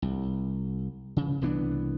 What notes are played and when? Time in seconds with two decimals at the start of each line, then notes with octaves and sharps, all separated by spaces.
0.02 C2
1.17 C#3
1.41 C2 E3 B3 D4